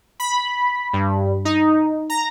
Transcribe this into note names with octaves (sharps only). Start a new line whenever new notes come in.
B5
G2
D#4
A#5